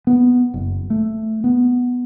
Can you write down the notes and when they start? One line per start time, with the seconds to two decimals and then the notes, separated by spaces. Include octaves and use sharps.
0.07 B3
0.54 F#1
0.90 A3
1.44 B3